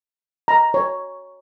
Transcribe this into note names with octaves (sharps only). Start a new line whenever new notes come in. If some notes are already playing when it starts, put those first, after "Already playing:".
A#5
C#5